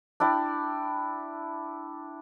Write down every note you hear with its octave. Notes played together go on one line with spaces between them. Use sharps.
D4 E4 D5 G5